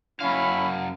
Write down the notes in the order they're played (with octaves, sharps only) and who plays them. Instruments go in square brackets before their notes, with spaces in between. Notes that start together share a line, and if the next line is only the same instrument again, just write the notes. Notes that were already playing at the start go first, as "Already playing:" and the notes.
[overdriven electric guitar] F#2 F5 [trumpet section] C#4 E4 B5